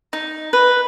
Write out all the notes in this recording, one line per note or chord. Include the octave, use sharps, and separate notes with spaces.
D#4
B4